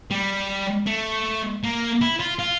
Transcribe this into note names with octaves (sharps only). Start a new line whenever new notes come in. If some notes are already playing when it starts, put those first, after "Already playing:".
G3
A3
A#3
E4
F4
F4